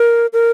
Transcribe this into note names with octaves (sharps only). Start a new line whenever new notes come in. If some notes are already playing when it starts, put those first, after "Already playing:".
Already playing: A#4
A#4